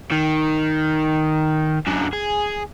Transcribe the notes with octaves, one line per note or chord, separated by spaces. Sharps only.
D#3
F#2 D3
G#4